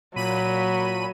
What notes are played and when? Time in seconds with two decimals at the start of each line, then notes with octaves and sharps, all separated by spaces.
0.16 A#2 F#3 B5 D#7